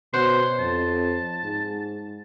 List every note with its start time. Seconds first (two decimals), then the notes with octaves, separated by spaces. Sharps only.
0.14 B2 C5 C#5 F#5 C6
0.59 F2 A5
1.44 G#2